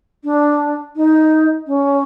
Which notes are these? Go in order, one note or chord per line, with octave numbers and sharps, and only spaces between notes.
D4
D#4
C#4